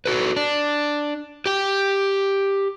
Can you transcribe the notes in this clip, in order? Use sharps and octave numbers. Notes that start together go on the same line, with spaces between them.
F#4 A4 B4
D4
G4 G5